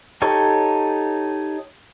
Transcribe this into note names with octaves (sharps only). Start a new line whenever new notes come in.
D#4 G4 A4 C#5 C#6